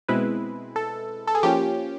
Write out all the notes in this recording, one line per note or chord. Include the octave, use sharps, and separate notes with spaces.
B2 G#3 C4 E4 B4
A4
A4
G#4
F3 A#3 C#4 F4 G4